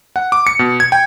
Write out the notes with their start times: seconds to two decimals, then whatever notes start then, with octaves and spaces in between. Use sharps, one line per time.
0.16 F#5
0.32 D6
0.47 C#7
0.59 B2
0.80 G#6
0.92 G5